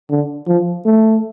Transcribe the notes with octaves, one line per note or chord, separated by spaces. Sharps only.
D3
F3
A3